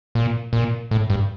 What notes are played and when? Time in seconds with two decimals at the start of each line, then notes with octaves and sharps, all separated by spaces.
0.15 A#2
0.53 A#2
0.91 A2
1.10 G2